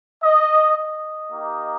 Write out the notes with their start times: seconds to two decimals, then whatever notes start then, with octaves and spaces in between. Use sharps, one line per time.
0.23 D#5
0.77 D#5
1.31 A#3 D#4 G4